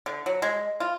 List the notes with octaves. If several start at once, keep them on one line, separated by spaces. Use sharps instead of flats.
D3
F#3
G#3
F4